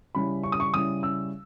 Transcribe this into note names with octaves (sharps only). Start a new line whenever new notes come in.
C#3 G3 C#4 E4 B5
C#6
D#6
C#6
C#3 G3 C#4 E4 D#6
E6